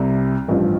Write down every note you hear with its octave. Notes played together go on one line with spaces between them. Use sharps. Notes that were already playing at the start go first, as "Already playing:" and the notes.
Already playing: C2 C3 G3
A1 G2 F3